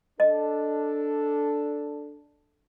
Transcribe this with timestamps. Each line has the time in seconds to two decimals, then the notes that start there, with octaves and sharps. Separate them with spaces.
0.20 D4 A4 D#5